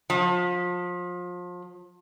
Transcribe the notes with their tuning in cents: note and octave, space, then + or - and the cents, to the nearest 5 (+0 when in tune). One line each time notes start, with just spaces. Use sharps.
F3 +30